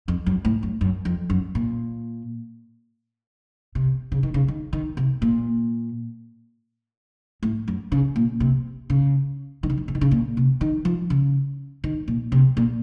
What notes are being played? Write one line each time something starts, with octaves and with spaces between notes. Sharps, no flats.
F2
F#2
A2
F#2
F#2
F2
F#2
A#2
C3
C#3
D#3
C#3
D#3
D#3
C3
A#2
A2
F#2
C#3
A#2
C3
C#3
D#3
C#3
D#3
C#3
D#3
C#3
A#2
C3
D#3
F3
C#3
D#3
A#2
C3
A#2